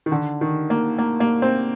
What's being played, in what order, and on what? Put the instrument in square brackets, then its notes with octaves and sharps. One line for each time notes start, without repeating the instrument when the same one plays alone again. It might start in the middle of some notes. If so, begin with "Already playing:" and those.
[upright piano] D#3
D3
D#3
A#3
A#3
A#3
C4